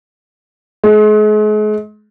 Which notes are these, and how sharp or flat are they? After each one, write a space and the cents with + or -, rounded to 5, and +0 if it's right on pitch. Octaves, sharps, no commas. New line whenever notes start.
G#3 +40